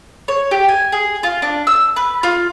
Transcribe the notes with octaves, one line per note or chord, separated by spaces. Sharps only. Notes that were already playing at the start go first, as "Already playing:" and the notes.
C#5
G4
G#5
G#4
F4
D4
E6
B4
F4